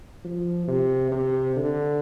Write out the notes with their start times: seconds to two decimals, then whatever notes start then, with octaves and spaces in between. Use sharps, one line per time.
0.25 F3
0.68 C3
1.12 C3
1.57 D3